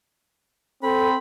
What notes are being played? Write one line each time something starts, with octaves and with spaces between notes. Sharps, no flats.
C4 A4 B5